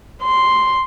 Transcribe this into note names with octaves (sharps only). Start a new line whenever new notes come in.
C6